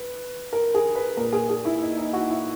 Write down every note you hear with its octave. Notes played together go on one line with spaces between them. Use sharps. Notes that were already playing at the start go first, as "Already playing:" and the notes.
Already playing: B4
A#4
G#4
B4
A#2 A#4
G#4
G#4
E4
D#4
D#4
F#4
E4